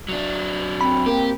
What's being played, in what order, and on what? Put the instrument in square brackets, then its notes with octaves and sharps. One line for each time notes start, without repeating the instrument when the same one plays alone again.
[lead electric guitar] F#3 D4
[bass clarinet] C4 [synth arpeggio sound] B5
[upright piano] A#3 [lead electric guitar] G4